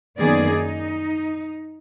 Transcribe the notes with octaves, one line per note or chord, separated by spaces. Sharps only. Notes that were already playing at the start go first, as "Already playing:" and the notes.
F#2 D#3 A#3 B3 G#4 D5
D#4